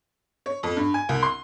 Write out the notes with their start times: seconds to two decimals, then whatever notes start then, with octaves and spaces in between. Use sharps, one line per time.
0.46 C#5
0.63 F2
0.77 G2
0.94 G#5
1.09 C2
1.23 C6